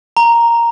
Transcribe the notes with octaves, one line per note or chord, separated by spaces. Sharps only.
A#5